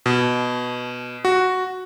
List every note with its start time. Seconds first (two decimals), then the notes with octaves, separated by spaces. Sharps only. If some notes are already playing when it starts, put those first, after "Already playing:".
0.06 B2
1.25 F#4